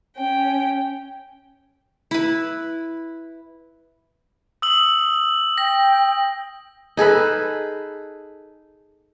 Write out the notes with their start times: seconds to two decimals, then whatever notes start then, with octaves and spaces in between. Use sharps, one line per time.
0.15 C#4 G5
2.11 E4 B4
4.62 D#6 E6 F#7
5.58 G5 A#6
6.97 D#4 G#4 A4 B4